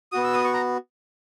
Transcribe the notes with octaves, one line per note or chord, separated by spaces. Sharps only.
B3 F#4 D#6
E6
D#6
C#6
A#5